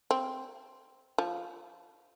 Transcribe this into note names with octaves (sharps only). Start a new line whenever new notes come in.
C4
F3